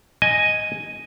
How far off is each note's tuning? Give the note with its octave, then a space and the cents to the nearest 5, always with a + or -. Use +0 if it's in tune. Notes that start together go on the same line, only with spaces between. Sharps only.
D#5 +0 G#5 +0